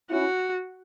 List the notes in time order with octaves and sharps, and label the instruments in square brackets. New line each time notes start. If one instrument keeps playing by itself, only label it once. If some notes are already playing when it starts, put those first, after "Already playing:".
[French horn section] C#4 E4 [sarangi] F#4